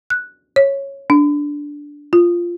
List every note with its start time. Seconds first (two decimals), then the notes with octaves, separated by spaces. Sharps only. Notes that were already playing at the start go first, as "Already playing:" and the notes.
0.10 F#6
0.56 C#5
1.10 D4
2.13 F4